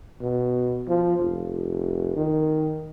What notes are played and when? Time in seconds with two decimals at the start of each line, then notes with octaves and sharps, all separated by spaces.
0.22 B2
0.88 F3
1.20 F1
2.16 D#3